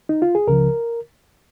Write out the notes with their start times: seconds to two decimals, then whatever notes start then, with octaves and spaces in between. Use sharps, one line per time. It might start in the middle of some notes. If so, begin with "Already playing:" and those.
0.09 D#4
0.22 F4
0.35 G#4
0.47 C#2 C#3 F3 A#4